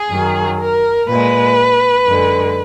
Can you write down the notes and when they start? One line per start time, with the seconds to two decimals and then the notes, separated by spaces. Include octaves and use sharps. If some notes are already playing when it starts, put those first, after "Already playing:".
Already playing: G#4
0.10 F#2 D#3 F#3
0.59 A#4
1.08 A#2 G#3 B4
2.06 F#2 D3 G#3